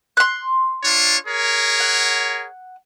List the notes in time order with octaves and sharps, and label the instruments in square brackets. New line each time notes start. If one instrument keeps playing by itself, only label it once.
[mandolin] C6 F#6
[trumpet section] D4 F4 C#5
G#4 A#4 C#5
[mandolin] F#5